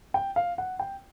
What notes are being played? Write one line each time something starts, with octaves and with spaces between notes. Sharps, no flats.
G5
F5
F#5
G5